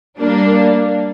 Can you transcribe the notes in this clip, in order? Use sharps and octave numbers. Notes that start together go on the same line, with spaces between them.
G3 A#3 D4